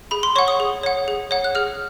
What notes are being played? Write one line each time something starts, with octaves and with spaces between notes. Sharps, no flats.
G#4 B5
C6
C#5 F#5 C#6
D#6
G#4
C#5 F#5
G#4
C#5 F#5
F#6
G#4 F6